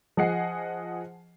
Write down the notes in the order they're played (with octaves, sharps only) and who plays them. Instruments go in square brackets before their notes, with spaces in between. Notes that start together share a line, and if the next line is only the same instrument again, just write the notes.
[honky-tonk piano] F3 G#4 D#5 F#5 G#5 C7